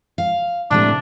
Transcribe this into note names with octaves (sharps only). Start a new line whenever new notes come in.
F5
A2 C3 A3 D4